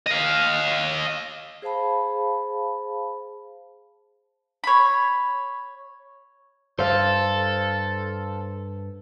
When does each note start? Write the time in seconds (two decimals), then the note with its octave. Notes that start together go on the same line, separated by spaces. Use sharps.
0.06 D#5 F5
1.62 G#4 C5 F5 A5 B5
4.64 C#5 B5
6.79 G2 A4 C5 F5